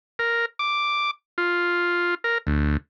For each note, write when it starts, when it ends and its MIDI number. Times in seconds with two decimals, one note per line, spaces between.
0.19 0.46 70
0.59 1.11 86
1.38 2.15 65
2.24 2.38 70
2.47 2.77 38